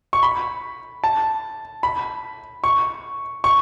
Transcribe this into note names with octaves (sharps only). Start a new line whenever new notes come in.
C#6
B5
A5
B5
C#6
C#6